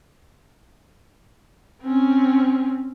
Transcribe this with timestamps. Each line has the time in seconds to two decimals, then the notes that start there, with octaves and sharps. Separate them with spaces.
1.82 C4 C#4